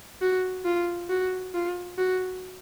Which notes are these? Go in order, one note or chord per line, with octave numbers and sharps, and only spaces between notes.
F#4
F4
F#4
F4
F#4